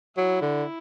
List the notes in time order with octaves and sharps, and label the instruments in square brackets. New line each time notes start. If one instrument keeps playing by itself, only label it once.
[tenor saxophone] F#3 [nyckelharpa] E4
[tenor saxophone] D3